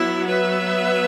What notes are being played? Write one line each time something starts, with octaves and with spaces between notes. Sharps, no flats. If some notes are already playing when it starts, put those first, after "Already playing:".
Already playing: F#3 B3 E4
B4 E5